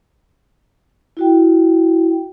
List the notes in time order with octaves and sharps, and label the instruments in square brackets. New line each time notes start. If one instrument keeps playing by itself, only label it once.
[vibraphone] E4 F#4 G5